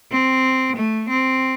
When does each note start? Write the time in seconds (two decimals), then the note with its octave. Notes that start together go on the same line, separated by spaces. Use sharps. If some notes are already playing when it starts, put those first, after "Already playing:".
0.11 C4
0.76 A3
1.09 C4